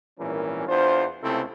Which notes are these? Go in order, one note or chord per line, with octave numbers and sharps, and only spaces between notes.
G#1 A#2 E3 G3 C#4 A#4
E2 D4 F4 C5
C#2 C3 A3 C4 E4 A4